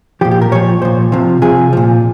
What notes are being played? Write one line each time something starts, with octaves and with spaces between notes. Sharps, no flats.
A#2 F3 G4
G4
A#4
A#2 F3 C#5
A#2 F3 C5
C3 F3
C3 F3 G#4
A#2 F3